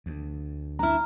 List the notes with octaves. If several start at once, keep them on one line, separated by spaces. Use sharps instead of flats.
D2
D4 E4 A#5 F6